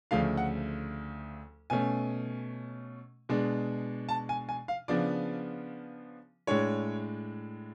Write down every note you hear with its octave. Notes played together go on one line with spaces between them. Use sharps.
D2 C#3 F3 A3 D4 F5
F#5
B2 A3 C#4 G#5
B2 G#3 D4
A5
G#5
G#5
F5
C#3 F3 B3 D4 D5
A2 G#3 D4 C#5